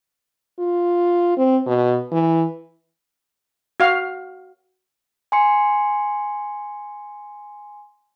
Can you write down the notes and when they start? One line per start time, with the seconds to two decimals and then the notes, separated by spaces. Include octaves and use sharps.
0.59 F4
1.37 C4
1.67 B2
2.12 E3
3.80 F#4 F5
5.32 G#5 C6 C#7